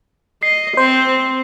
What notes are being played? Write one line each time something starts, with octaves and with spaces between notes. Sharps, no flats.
D#5 C7
C4 C5